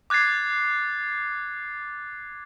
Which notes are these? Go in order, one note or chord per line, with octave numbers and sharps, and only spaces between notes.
D6 F#6 G#6 A6 C7